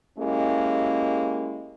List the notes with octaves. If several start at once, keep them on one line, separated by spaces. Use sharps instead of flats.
G#3 A#3 C#4 E4 G4